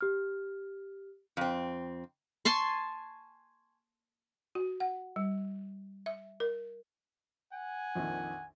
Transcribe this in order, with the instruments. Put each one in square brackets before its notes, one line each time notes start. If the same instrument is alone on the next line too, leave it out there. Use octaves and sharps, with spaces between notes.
[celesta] G4 F6
[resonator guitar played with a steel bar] F2 C4
[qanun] G#5 A5 C6 C#6
[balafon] F#4
F#5
G3
E5
A#4
[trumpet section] F#5 G#5
[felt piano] A#1 F2 D#3